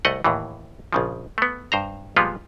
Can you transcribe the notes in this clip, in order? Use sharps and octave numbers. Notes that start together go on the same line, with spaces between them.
C2 A3 D#5 F#5
D#2 A2 E3
A#1 C#3 F3
A3 B3
G2 C5 A#5
A#2 F3 G3 G#3 B3 F4